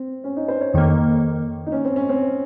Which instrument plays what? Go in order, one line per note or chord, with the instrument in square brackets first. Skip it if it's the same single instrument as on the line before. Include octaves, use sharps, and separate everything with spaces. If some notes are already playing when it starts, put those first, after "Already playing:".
Already playing: [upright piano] C4
C#4
D#4
C5
C#5
[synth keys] F2 D#3 A#3 [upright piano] D#4
[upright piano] D#4
C#4
C4
C#4
C4